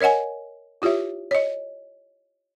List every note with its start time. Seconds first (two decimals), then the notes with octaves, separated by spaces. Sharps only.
0.01 A#4 C#5 D#5 F#5 G#5
0.82 E4 F4 G4 C#5 E5
1.31 C#5 D#5